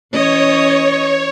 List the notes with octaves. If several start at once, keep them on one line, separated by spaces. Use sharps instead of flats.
E3 C#4 C#5 D#5